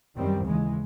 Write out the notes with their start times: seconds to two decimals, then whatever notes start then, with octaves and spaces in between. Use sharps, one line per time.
0.15 F#2 D#3 G3 C4
0.45 D#2 C#3 E3 G#3